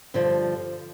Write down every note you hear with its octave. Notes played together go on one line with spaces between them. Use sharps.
G2 D3 F3